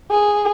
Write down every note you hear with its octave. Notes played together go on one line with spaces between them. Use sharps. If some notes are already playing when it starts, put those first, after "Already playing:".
G#4